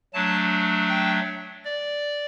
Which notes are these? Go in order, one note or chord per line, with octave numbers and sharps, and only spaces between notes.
F#3 A3 D4 A5
G5
D5